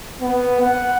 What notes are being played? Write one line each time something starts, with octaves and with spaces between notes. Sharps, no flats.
B3
F#5